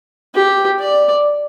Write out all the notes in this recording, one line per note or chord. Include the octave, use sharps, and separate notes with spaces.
G4
D5